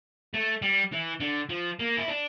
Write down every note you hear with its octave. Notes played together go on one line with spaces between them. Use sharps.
A3
G3
E3
D3
F3
A#3
E4
D4